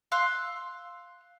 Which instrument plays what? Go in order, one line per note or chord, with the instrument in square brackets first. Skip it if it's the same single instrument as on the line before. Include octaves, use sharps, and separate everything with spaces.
[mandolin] F5 C6 E6 F#6